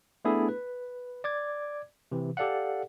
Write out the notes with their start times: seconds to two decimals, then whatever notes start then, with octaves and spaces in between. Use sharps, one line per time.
0.25 A3 B3 D4 E4 G#4 A4
0.49 B4
1.24 D5 D6 G#6
2.12 C3 E3
2.37 G4 A4 D5 F5 F#5